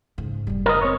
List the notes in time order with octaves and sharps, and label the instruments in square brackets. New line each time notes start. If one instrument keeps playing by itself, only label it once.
[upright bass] G#2 C#3
F1 G3
[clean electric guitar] A#4 D#5
C4 C#5